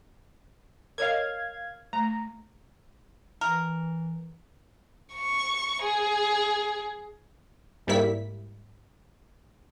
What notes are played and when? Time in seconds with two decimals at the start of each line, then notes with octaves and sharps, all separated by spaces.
0.98 A#4 C#5 D#5 F5 G#6
1.93 A3 A#5
3.41 E3 A#4
5.14 C#6
5.83 G#4
7.87 G#2 G3 A#3 E4 B6